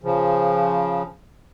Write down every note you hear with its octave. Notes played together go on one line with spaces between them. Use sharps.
C#3 F3